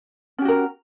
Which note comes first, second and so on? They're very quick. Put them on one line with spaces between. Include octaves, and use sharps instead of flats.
C#4 G4 F#4 A#4